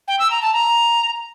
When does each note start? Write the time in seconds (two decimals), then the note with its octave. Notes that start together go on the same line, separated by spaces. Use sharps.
0.08 G5
0.19 E6
0.31 A#5
0.42 A5
0.54 A#5